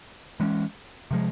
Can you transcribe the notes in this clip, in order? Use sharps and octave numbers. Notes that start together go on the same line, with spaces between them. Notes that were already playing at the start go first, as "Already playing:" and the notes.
E3 G#3 C#4
C3 F3 G#3